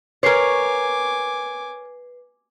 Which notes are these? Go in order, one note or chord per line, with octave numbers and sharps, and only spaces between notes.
A#4 B4 C#5 G#5 D6 C7